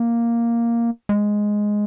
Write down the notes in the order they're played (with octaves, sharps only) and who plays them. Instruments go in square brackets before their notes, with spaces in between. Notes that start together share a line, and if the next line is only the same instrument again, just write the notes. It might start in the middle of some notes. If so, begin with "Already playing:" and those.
Already playing: [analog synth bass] A#3
G#3